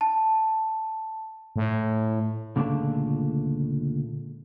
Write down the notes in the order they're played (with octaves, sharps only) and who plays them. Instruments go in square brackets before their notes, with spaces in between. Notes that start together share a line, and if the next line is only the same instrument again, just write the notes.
[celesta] A5
[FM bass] A2
[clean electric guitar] C#2 A#2 D3 G3 A3